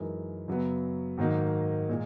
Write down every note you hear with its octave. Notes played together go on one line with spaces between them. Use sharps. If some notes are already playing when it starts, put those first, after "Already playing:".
Already playing: F#2 E3 G#3 D#4 A#4
F#2 C#3 F#3 B3
G#2 D#3 F#3 A#3 D#4
A#2 G#3